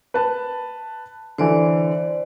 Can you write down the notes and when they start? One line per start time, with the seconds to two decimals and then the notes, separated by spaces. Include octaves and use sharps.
0.14 B4 A5
1.38 D3 E3 C5 D5